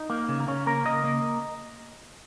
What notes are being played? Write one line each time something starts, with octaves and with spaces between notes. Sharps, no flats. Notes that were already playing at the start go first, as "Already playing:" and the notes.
Already playing: D#4
A#3
C#3
A#3
C#3 C#4
A#3 A#4
C#3 D#5
A#3